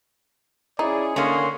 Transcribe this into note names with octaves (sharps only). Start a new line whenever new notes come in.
C#4 D#4 E4 G#4 D5
D3 A#3 C#4 G#4 C6